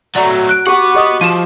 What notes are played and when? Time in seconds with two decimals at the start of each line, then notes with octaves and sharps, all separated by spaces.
0.16 F#3 A3 F#4 D5 A#5
0.49 F#6 D7
0.67 F#4 G4 B4 F#5 D6
0.95 G4 D#5 D#6
1.21 F3 D#4 F4 D#7 E7